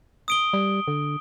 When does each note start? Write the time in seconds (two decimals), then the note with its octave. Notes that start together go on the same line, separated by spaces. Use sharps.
0.28 D#6 D7 G7
0.53 G3
0.88 D3